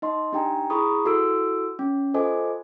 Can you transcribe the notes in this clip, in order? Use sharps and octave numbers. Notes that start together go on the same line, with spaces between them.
D#4 D#5 C6
D4 D#4 G4 G5 G#5 A#5
E4 G#4 A#5 B5 C#6 D#6
E4 F#4 A4 E6 D7
C#4
F4 A4 C5 D#5 G#5 D6